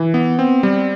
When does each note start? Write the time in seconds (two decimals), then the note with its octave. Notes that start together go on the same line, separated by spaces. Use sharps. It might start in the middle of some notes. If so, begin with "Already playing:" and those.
Already playing: E3
0.14 B3
0.39 C4
0.63 G3